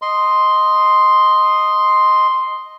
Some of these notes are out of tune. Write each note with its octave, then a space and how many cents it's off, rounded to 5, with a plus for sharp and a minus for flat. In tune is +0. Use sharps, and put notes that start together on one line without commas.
D#5 +0 C6 +0